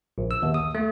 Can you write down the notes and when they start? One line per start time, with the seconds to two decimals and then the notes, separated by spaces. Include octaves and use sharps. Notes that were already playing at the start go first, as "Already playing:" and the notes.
0.18 A#1
0.31 E6
0.43 D#2
0.54 D#6
0.75 A3